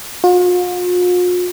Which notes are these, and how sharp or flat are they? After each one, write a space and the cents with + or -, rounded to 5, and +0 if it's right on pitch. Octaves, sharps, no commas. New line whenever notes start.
F4 +45